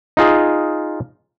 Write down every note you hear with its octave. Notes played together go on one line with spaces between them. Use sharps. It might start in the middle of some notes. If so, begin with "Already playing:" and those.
D#4 F4 G#4